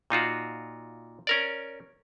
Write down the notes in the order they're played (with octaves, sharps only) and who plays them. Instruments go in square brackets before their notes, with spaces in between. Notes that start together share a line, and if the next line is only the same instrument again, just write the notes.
[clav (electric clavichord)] A#2 D#4 F4 F#4
C#4 A#4 D5